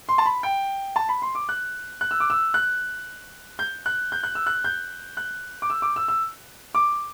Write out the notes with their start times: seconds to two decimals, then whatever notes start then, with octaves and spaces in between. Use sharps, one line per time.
0.09 C6
0.18 A5
0.26 B5
0.43 G5
0.96 A5
1.09 B5
1.22 C6
1.35 D6
1.49 F#6
2.01 F#6
2.11 E6
2.20 D6
2.30 E6
2.54 F#6
3.59 G6
3.86 F#6
4.12 G6
4.23 F#6
4.35 E6
4.46 F#6
4.64 G6
5.17 F#6
5.62 D6
5.70 E6
5.82 D6
5.96 E6
6.08 E6
6.75 D6